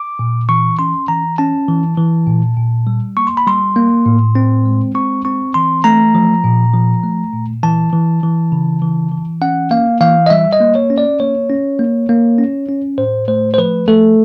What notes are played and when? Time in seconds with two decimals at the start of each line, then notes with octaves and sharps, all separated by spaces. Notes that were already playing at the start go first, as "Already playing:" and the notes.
Already playing: D6
0.19 A#2
0.49 E3 C#6
0.79 C#4 C6
1.08 E3 A#5
1.38 C#4 A5
1.68 E3
1.98 E3
2.27 A#2
2.57 A#2
2.87 G3
3.17 A#3 C#6
3.27 C6
3.37 B5
3.47 G3 C6
3.76 A#3
4.06 A2
4.35 C4
4.66 G#3
4.95 C4 C#6
5.25 C4 C#6
5.54 E3 C6
5.84 A3 A#5
6.15 F3
6.44 A#2
6.74 F3
7.03 A3
7.33 A#2
7.63 E3 A5
7.93 E3
8.23 E3
8.52 C#3
8.82 E3
9.11 E3
9.41 C#4 F#5
9.71 A#3 F5
10.01 E3 F5
10.26 D#5
10.30 G3 E5
10.53 D#5
10.61 A#3
10.75 C#5
10.90 C#4
10.98 D5
11.20 A#3 C#5
11.50 C#4
11.79 A#3
12.09 A#3
12.38 C#4
12.69 C#4
12.98 A2 C5
13.28 A3 C5
13.54 C5
13.58 F3 B4
13.88 A3 A4